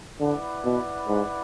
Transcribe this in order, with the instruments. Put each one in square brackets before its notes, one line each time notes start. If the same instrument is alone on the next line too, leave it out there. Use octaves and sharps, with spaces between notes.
[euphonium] D3 [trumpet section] E4 B4 D5 F#5
[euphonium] B2
G#2